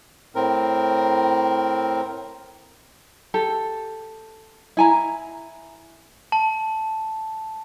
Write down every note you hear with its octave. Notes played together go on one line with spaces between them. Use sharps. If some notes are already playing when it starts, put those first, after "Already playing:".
A2 C4 A#4
G4 A4
E4 G#5 A#5
A5